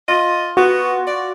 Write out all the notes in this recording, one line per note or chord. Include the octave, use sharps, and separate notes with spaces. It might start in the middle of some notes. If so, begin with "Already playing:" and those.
F4 D#5
B3 F#4
D5